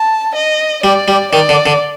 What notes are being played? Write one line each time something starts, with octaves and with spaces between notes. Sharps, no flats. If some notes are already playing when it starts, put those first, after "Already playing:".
Already playing: A5
D#5
G3 D5
G3
D#3 D5
D3
D3